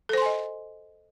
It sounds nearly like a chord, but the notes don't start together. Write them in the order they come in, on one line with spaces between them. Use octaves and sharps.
A4 C5 C6 G#5 D#5